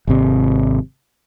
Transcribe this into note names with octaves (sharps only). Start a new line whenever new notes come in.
G#1 C3